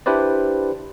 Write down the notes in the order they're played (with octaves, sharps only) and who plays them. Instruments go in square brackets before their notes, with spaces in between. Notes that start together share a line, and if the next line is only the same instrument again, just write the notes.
[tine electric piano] D4 E4 G4 B4 C5 D5